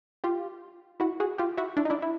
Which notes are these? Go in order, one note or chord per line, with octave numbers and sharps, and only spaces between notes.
F4 G4
E4 F#4
F#4 G#4
F4 G4
E4 F#4
D4 E4
D#4
D4 E4
E4